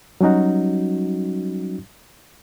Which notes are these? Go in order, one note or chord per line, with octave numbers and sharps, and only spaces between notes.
F#3 G3 C#4 D#4 F#4